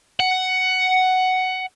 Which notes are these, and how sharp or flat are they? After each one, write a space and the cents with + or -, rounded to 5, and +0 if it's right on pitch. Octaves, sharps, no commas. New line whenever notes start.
F#5 +10